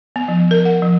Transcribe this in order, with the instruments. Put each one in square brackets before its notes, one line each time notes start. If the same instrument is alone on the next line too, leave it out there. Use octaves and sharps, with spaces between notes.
[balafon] B3
F3
A#4
F#5
F3